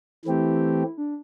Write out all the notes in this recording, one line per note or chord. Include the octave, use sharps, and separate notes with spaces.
E3 A3 C4 E4 G4
D4